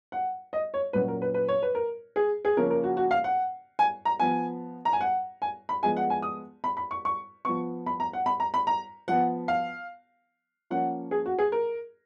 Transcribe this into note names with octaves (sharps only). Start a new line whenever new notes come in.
F#5
D#5
C#5
A#2 F#3 C#4 B4
A#4
B4
B4
C#5
B4
A#4
G#4
G#4
C#3 F3 A#3 C#4 A#4
A#4
F#4
F#4
F5
F#5
G#5
A#5
F3 B3 G#5
A#5
G#5
F#5
G#5
B5
F3 G#3 B3 G#5
F#5
G#5
D#6
B5
B5
C#6
C#6
F3 B3 C#6
B5
A#5
F#5
B5
A#5
B5
A#5
F3 B3 F#5
F5
F3 A#3 C#4 F#5
G#4
F#4
G#4
A#4